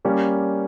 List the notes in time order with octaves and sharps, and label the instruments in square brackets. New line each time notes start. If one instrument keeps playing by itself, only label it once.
[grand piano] G3 A#3 C#4